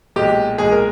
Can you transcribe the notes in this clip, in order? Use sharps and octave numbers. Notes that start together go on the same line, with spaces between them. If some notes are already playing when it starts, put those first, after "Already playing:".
B1 A#2 G#3 G4
B1 A#2 G#3 G#4
A#4